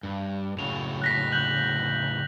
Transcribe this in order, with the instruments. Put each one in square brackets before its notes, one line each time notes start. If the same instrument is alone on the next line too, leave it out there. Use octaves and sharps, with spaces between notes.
[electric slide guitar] G2
[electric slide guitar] A2 C#3 F#3 [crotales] F7
[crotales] F#6 A#6 B6
F#6 G6 F#7